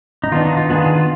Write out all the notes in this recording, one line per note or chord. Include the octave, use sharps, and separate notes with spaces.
D#4
D#3 B3 D4 F4
D#4
F4
D#3 B3 D4 F4 G#4
F4 G#4
F4